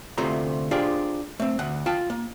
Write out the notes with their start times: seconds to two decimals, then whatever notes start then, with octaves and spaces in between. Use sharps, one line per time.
0.18 D2 C3 A3 F4 C5 A#5
0.71 D4 F4 G4 G#4 C5
1.40 A3 C4
1.59 D2 F#5
1.86 F4 G5 A5
2.10 A#3